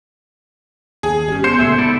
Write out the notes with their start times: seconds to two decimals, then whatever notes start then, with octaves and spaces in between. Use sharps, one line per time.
1.03 D#2 G#4
1.28 G1 C#4 G4
1.44 B3 C5 C6 G6 C#7
1.59 C#2 A#2 D3 A3 G#4 E5
1.78 G#2 E4 A4 D5